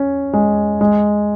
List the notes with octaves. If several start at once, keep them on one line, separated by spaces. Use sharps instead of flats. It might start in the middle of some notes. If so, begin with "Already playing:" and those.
Already playing: C#4
G#3
G#3